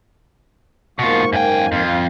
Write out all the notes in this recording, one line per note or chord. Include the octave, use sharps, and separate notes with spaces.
G#2 B2 A#3 F4 C#6
F#2 G5 G#5
F2 F4